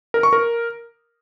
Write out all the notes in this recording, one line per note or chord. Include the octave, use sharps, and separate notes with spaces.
A#4
C#6
A#4